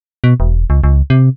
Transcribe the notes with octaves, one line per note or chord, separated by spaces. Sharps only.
B2
E1
C#2
C#2
C3